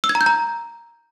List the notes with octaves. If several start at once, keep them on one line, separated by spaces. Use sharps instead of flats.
E6
G#6
A#5
G6
A#5